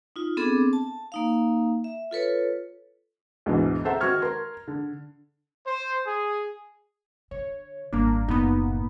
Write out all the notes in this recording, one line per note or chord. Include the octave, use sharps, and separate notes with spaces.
D#4 F4
B3 C4 D4 G#4 A4 D6
A5
A#3 D#4 F5
E5
F4 A4 B4 C#5
D2 G#2 B2 D3 E3
A4 C5 E5 F#5 A#5
D#3 F#4 F#5 C#6 F6 G#6
A#4 C6
D3
C5
G#4
D3 C#5
G#1 G3 A#3 D4
F#1 A2 A#3 B3 D#4